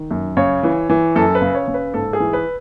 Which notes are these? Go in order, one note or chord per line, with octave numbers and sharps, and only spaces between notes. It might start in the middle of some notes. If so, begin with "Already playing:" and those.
Already playing: D#3
F#2
C#3 C#5
E3
E3
F#2 A4
B4
C#3
C#5
C#3
B4
G#2 A4
G#4
E3
B4